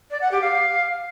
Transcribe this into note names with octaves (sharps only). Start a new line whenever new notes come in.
D5
F#5
G4
F5